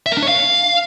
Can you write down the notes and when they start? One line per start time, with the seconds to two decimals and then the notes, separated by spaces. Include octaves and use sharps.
0.06 E5
0.12 A#4
0.17 D4
0.23 C#5
0.28 F5